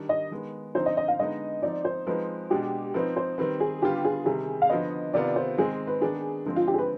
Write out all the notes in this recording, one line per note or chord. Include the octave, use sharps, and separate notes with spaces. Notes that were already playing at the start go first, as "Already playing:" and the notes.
Already playing: D#3 G3 D4
D#5
D#3 G#3 B3
D3 F3 C4 D#4 C5
D#5
D#5
F5
D3 G#3 B3 D#4 D#5
F3 C4 D#4 D5
C5
F3 G#3 C4 D#4 B4
B2 G#3 D4 G4
F3 C4 D#4 B4
C5
D#3 G3 C4 B4
G#4
D3 G3 B3 F4 G4
G#4
C3 D#3 G3 G#4
F5
D3 F3 B3 D#5
C3 D#3 B3 F4 D5
C5
D#3 G#3 C4 G#4
B4
D#3 B3 D4 G#4
D3 F3 G#3 C4
F4
G4
G#4
B4